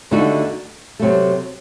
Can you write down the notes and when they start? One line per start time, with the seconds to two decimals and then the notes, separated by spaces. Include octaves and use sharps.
0.11 D#2 D3 A3 D#4 F#4
0.99 C3 F#3 A3